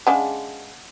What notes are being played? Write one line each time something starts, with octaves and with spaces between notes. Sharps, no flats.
C#3 G#3 D4 F#5